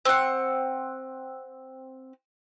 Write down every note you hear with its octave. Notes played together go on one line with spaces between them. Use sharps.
C4 F#5